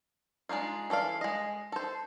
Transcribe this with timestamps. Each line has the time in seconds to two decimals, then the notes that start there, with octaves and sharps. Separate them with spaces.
0.49 G#3 D4 D#4 F4
0.90 E3 A4 D5 F5
1.21 G#3 D#5
1.72 A4 C5